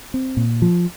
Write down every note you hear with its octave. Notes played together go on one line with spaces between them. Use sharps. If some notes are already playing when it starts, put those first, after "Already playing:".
C4
A#2
F3